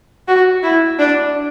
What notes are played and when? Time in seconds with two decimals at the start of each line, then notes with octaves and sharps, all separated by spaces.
0.28 F#4
0.63 E4
0.99 D4